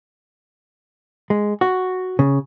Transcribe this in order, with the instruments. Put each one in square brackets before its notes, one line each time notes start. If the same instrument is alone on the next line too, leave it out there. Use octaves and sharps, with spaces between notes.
[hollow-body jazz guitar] G#3
F#4
C#3